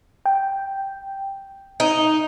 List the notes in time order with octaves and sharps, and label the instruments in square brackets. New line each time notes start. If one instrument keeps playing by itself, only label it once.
[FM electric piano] G5
[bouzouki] D#4